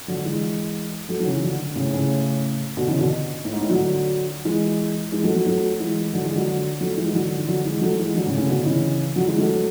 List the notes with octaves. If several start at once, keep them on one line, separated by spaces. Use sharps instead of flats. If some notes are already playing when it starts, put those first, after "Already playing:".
D3 F#3
E3 G#3
F#3 A3
F#3
C#3 E3
D3 F#3
A2 C#3
A2 C#3
B2 D3
C#3 E3
B2 D3
A2
G#2
A2
D3 F#3
E3 G#3
E3 G#3
F#3 A3
F#3 A3
F#3 A3
E3 G#3
D3 F#3
E3 G#3
D3 F#3
F#3 A3
E3 G#3
E3
D3 F#3
E3
D3 F#3
E3 G#3
F#3 A3
E3 G#3
D3 F#3
A2 C#3
A2 C#3
B2 D3
C#3 E3
D3 F#3
E3 G#3
F#3 A3